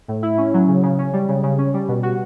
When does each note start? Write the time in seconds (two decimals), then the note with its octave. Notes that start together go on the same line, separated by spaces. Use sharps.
0.08 A2
0.23 E4
0.38 C#4
0.54 F#3
0.68 C#3
0.83 C#3
0.99 C#4
1.13 G3
1.29 C#3
1.43 C#3
1.58 C#4
1.74 G3
1.88 B2
2.03 F#4